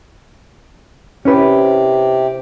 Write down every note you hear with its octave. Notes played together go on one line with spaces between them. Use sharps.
C3 C#4 E4 G4 B4